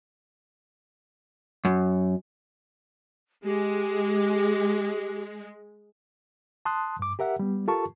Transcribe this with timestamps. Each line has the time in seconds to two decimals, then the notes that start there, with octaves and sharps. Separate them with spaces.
1.65 F#2
3.45 G#3 G4
6.65 A5 C6 D#6 F#6
6.99 G2 D6
7.19 G4 A#4 E5 F#5
7.39 G3 B3
7.68 F4 G4 A4 A#4 A5 C#6